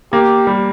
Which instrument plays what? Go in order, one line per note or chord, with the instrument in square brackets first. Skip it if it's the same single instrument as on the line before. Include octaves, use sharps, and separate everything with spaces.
[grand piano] A#3 [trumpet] G4
[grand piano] G3